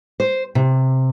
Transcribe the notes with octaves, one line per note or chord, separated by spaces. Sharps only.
C5
C3